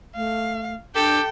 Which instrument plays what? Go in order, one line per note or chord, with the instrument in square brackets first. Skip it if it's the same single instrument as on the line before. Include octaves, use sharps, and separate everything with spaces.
[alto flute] A3 [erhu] F5
[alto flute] D4 [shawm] G4 [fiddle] A4 [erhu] G5